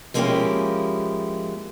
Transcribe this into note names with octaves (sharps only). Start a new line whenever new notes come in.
F3 G#3 A#3 C#4 E4 G4